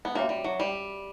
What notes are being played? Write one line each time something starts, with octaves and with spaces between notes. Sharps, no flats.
B3
A#3 C#4 F#4 C#5 E5 G5
G3
F#3
G3